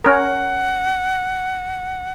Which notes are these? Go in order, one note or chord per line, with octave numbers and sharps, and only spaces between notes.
C#4 A#4 F#5